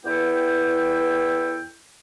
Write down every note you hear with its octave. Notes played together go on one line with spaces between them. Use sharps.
E2 B3 E4 A4 G5